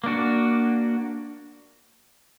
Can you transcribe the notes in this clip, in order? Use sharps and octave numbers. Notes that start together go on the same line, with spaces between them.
A#3 D4 F#4